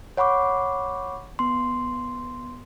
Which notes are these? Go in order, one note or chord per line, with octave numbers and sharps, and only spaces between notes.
C#5 F#5 B5 C#6 D6
B3 C6